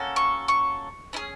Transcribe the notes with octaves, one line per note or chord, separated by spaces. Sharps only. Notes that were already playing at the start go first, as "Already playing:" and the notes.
Already playing: A#3 C#4 F#4 A4
C#6
C#6
C#4 E4 G#4